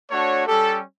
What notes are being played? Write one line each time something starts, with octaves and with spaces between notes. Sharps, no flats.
A3 D4 F#4 C#5
G3 C#4 G4 A4